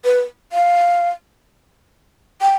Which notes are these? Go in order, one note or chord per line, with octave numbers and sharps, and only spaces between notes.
B4
F5
G5